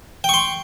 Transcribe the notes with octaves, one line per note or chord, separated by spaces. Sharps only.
G5 C6 C#6